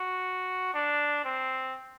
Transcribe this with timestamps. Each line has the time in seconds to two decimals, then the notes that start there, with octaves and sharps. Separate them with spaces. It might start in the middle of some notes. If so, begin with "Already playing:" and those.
Already playing: F#4
0.74 D4
1.24 C4